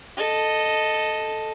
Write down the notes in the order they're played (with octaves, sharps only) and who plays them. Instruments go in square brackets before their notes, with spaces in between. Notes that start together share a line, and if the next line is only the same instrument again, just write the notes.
[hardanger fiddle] A4 D#5